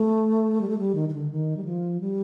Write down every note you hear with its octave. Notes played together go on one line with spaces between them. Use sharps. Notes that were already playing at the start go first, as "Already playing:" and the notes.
Already playing: A3
G3
A3
G3
D#3
D#3
D3
D#3
G3
F3
G3